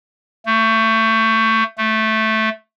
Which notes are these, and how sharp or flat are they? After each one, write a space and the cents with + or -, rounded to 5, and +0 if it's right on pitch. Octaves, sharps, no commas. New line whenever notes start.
A3 +25
A3 -5